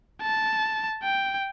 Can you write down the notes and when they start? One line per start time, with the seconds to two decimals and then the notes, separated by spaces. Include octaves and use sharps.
0.22 A5
1.03 G5